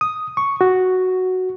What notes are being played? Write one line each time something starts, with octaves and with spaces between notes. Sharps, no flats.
D#6
C#6
F#4